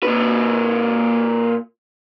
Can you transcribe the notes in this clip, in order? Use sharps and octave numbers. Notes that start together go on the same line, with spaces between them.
A#2 B4